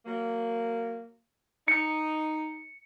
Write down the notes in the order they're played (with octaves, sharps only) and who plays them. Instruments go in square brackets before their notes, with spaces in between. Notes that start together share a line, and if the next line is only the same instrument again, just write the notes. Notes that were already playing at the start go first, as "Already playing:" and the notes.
[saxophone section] F#3 A#3
[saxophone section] D#4 [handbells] C#7